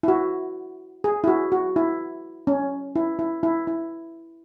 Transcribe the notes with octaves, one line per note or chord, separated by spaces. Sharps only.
E4
F#4
G#4
E4
F#4
F#4
E4
C#4
E4
E4
E4
E4